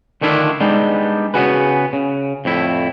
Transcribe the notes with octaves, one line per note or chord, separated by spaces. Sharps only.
D3 D#3 A3 D4 E4 F4
G3 G#3 B3 D4 D#4
C#3 B3 C4 F#4 G#4 B4
C#3
F2 A2 E4